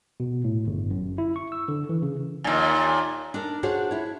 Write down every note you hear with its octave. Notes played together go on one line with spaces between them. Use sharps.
B2
A2
G1
F#2
E4
C#6
E6
D3
E3
C#3
D#2 A#2
D4 D#4 A#4
D4 F4 F#4 G#4 C5 C#5
E4 C#5